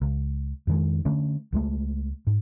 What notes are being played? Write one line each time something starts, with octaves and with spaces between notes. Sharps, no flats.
C#2
F2 D#3 G#3
D3 A3 C#4
C#2 G#3 A3
G#2